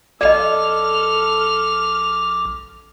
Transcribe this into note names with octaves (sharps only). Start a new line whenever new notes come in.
A#1 A4 D5 D#5 D6 F6